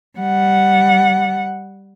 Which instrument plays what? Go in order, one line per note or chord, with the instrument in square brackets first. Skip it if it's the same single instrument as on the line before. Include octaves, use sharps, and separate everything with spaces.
[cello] G3 F#5